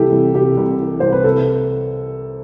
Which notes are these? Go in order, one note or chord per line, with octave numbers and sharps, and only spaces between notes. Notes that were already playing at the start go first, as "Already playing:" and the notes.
Already playing: C2 C3 E3 G4 A4
C2
C3 G4
C2
E3
C2 C5
B4
C3 A4